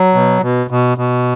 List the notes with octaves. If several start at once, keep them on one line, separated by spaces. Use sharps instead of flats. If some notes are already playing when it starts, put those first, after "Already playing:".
Already playing: F#3
B2
B2
B2
B2